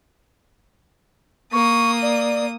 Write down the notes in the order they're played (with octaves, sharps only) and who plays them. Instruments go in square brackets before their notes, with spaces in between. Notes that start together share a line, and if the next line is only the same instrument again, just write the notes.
[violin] A#3 D#6 [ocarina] C#6
[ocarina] D5